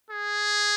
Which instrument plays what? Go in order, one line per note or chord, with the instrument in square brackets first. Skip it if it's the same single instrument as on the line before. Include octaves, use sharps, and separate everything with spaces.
[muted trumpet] G#4